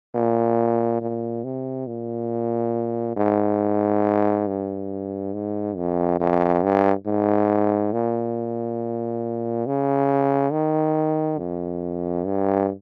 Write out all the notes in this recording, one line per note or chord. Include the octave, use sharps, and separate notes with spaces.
A#2
A#2
C3
A#2
G#2
G2
G#2
F2
F2
G2
G#2
A#2
C#3
D#3
F2
G2